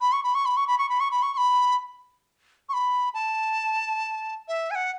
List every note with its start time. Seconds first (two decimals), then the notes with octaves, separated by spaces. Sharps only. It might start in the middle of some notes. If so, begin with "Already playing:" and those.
0.01 B5
0.12 C#6
0.24 B5
0.35 C#6
0.46 B5
0.57 C#6
0.67 B5
0.78 C#6
0.89 B5
1.00 C#6
1.11 B5
1.23 C#6
1.34 C#6
1.37 B5
2.69 C#6
2.73 B5
3.14 A5
4.48 E5
4.71 G#5
4.75 F#5